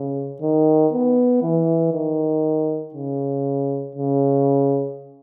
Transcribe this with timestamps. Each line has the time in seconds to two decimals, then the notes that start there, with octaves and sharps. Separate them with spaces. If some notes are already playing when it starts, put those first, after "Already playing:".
Already playing: C#3
0.41 D#3
0.92 B3
1.42 E3
1.93 D#3
2.94 C#3
3.96 C#3